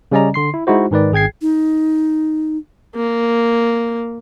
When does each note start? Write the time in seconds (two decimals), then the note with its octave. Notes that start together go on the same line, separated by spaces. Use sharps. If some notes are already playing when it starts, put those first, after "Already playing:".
0.12 C#3 G3 C#4 D5 D#5 A#5
0.34 D3 C6 C7
0.54 E4
0.67 G#3 D#4 E4 F#4 C5
0.91 G#2 D#3 B4 D5
1.12 G#1 G#4 G5 G#6 C7
1.42 D#4
2.96 A#3